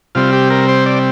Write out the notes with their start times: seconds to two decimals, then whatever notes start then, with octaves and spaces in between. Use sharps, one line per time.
0.15 C3 G3 C4 F4
0.33 G4
0.50 A#4
0.68 C5
0.86 D5